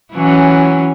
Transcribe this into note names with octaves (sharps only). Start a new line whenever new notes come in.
E3 F#3 C#4